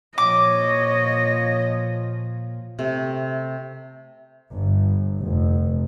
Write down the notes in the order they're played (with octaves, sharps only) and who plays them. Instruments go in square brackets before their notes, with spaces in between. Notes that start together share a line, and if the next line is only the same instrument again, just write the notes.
[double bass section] A#2 F3 [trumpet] C#5 [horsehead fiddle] D#5 [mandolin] D6
[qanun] C3 A3
[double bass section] G1
F1